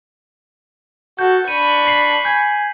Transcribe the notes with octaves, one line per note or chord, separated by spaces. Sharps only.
F#4 A4 G6
D4 B5 C#6 D#7
B6 C7 F#7
G#5 G6